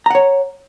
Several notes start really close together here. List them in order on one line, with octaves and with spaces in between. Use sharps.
A#5 F#5 C#5